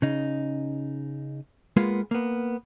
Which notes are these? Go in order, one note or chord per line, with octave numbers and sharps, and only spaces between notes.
C#3 D#4
G#3 A#3 B3 F4
A#3 B3